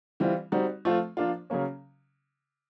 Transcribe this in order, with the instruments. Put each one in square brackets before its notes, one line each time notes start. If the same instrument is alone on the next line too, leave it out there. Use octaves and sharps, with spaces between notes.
[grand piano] E3 G3 C4 F4
G3 C4 D#4 F#4
F3 A3 C4 F4
F3 A#3 D4 F4
C#3 F#3 A#3 C#4